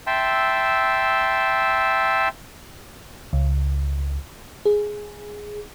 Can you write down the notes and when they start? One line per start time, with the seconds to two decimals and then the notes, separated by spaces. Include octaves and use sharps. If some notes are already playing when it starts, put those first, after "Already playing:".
0.07 E5 G5 A5 C6 E6
3.33 C#2
4.65 G#4